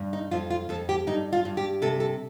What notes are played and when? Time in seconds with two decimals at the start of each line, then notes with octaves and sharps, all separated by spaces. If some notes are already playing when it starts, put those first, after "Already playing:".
Already playing: G2
0.13 D#4
0.31 F2 F4
0.50 F4
0.69 F2 A4
0.89 G4
1.07 G2 D#4
1.33 F4
1.45 G2
1.57 G4
1.82 C3 A4
2.00 A4